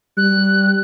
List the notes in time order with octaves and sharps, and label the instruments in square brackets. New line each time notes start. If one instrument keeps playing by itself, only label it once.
[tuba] G3 [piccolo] F#6